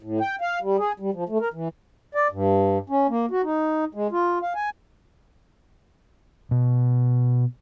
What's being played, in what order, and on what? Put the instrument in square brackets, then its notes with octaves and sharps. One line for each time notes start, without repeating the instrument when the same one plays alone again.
[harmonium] A2
G5
F5
G3
G#4
G3
F3
A3
A#4
E3
D5
G2
C#4
A#3
F#4
D#4
G#3
F4
F5
G#5
[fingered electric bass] B2